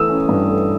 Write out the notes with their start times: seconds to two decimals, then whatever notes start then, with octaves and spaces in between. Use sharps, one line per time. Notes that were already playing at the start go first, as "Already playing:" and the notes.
Already playing: E3 A3 D#6 E6
0.09 C#4
0.29 G2
0.48 A3